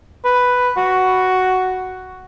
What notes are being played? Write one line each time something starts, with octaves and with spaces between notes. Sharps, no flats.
B4
F#4